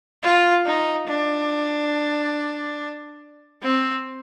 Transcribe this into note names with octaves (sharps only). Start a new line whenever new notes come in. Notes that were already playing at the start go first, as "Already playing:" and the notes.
F4
D#4
D4
C4